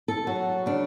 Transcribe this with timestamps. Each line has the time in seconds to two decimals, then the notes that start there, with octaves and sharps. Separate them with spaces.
0.08 A4
0.27 F#3 F#4
0.66 C#3 D4